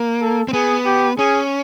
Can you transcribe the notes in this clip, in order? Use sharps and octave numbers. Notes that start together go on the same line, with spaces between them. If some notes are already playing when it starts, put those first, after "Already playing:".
Already playing: A#3
A4
C4
B3 G#4
G4
C#4 G#4